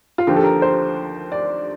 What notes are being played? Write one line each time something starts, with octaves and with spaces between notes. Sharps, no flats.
F4
D#2 D3 F3 G4
A4
A#4
C5
D5